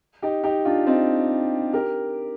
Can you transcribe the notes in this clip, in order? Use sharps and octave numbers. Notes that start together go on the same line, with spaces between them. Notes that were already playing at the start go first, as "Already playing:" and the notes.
D#4 G4
D#4 G4
D4 F4
C4 D#4
G4 A#4